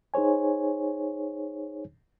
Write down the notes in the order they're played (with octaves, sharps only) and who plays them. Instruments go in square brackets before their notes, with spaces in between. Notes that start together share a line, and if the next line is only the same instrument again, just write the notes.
[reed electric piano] D#4 G#4 C5 C#5 G#5